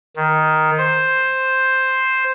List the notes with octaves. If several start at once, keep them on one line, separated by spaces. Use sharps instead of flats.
D#3
C5